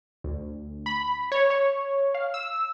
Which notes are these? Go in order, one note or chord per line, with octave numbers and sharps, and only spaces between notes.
D2
B5
C#5
C#5
F5
E6